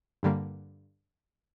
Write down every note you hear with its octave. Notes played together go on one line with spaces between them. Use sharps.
G2 D3 G3 A#3